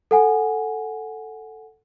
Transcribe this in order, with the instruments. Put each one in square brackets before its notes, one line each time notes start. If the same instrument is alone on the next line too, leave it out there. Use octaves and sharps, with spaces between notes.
[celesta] A4 F#5 G#5